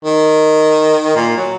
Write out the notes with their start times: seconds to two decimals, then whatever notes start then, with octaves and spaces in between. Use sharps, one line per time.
0.05 D#3
1.16 A#2
1.37 F#3